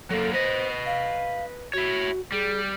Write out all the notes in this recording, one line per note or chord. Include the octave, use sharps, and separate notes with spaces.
F#3 A#3 A4
B4 C5 D#5
F5
E4 F#4 C#5
G3 G#4